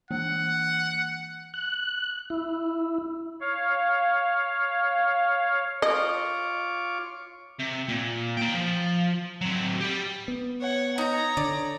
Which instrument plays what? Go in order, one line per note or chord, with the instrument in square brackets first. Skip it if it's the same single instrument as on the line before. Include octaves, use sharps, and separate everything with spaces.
[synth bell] E3 A#3 [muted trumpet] F#5
[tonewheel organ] F#6
E4
[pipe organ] C#5 F5
[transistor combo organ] F4 C#5 D6 [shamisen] D#5
[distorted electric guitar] C3
A#2
A#3 G5
F3
F#3 C4
G4 D5
[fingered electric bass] B3
[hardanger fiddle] C#5 F#5
[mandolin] D#4 G6 [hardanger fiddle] C#5 A#5
[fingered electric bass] D3 [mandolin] D5